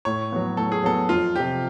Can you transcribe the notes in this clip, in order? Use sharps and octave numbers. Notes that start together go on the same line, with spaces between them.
A2 C#5
F#3 B3
A2 A4
G#4
F#3 B3 A4
F2 F4
C3 F3 G4